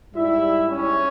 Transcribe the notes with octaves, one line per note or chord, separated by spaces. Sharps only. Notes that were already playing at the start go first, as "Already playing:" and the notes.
G#2 G3 E4 E5
C#4 C#5